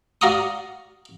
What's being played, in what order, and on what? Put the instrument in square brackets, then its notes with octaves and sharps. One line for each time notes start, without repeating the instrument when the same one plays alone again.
[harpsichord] F#4 D5 F5 A#5 C#6 D#6